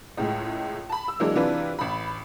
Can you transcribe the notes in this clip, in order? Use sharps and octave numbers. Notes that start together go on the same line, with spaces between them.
C#2 A2 G#3
A5 B5
E6
E3 F#3 G#3 A#3 D4
C3 E3 D4 F4 B4
A1 B5